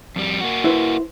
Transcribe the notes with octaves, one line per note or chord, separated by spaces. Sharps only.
F2 G3
A#3 F#4
E4 B4 C5